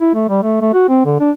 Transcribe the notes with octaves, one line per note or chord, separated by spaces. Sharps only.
E4
A3
G3
A3
A3
F#4
C4
D3
D4